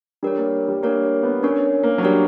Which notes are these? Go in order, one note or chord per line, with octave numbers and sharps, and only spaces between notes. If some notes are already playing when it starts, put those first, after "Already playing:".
G3 D4 A#4 C#5
A#3
G3
A#3 D4 A#4 C#5
B3
C#4 D4 A#4 C#5
A#3
F#3
G3 D4 A#4 C#5